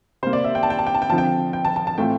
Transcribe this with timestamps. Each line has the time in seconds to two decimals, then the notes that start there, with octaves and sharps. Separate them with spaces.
0.23 C3 G3 A#3 C5
0.33 D5
0.44 E5
0.55 G5
0.63 A5
0.70 G5
0.79 A5
0.87 G5
0.95 A5
1.02 G5
1.10 D3 F3 C4 F4 A5
1.18 G5
1.53 G5
1.65 A5
1.76 A5
1.87 A5
1.98 A2 E3 A3 C4 F4 G5